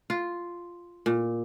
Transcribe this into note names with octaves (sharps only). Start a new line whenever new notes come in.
F4
A#2